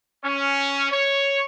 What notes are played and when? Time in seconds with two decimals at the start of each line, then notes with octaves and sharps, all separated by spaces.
0.24 C#4
0.92 C#5